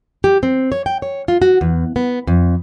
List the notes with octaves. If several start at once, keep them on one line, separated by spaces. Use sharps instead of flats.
G4
C4
C#5
G5
C#5
F4
F#4
E2
B3
F2